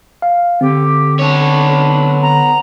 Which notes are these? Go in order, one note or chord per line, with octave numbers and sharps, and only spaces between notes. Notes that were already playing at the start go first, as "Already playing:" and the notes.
F5
D3 C4 G4
B3 D4 C#5
A#5